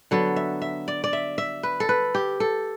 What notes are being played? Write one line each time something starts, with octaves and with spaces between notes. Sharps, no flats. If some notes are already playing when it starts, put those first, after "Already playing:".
D3 F#3 B3 A4
E5
E5
D5
D5
E5
E5
B4
A4
B4
G4
A4